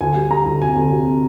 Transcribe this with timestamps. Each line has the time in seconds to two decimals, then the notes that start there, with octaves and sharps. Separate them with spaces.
0.01 D2 G#5
0.15 G3
0.30 G3 A#5
0.45 D2
0.61 C3 G#5
0.76 D2
0.91 C3